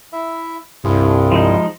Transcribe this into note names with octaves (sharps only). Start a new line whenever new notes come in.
E4 E5
C2 G2 E4 F4 G#4
F3 G#3 D#4